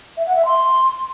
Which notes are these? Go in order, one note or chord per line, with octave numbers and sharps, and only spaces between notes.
E5
F#5
E5
C6